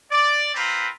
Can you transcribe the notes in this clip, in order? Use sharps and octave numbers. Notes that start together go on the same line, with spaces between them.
D5
C4 F4 B4 A#5 B5